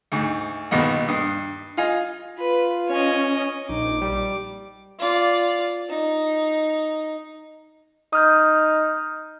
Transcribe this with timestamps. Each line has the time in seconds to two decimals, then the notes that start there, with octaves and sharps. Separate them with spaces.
0.12 D2 G#2
0.71 A#1 D#2 B2 B3 D#5
1.08 G2 D#6
1.77 F4 D#5 F5 G#5
2.39 F4 B4
2.89 C#4 C#5 D#5
3.69 A#1 D#4 D6
4.01 G3
4.99 F4 D5
5.90 D#4
8.13 D#4 D#6 F6 G6